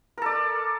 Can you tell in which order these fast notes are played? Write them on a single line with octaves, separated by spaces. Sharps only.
A#4 A4 D5